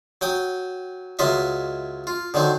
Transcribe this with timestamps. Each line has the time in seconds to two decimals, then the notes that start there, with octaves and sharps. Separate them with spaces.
0.21 F#3 G5 D#6
1.19 C#2 F#3 F4 D#5 E5
2.07 F4
2.34 D3 D#3 F#3 C4